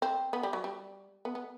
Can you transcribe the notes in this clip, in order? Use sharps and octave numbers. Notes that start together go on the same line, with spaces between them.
C4
B3
G3
F#3
G3
B3
B3